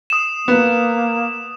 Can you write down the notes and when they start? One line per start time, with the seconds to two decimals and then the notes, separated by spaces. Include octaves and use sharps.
0.10 D#6 E7
0.48 A#3 B3